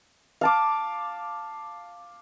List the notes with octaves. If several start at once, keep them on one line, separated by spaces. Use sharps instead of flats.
F5 A5 D6